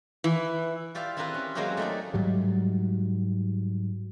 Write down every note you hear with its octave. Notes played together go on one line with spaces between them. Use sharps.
E3
F4 G4 D5 E5 F5
C4 E4 F4 G4 A#4 B4
C#4
F#3 G#3 A#3 C4 C#4 G4
A3 D#4 D5
G#2 F#3 G3